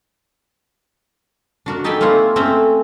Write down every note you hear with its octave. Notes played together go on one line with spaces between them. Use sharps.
D4 F#4 A#4
D#4 G4 A4 G#5 A5 B5
A#3 C4 E4 F4 C#5 F#5
A3 C4 C#4 E5 A#5